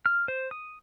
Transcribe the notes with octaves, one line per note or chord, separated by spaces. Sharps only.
F6
C5
D#6